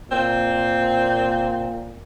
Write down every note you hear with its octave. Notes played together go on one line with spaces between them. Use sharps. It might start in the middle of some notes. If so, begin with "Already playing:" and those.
A#2 C4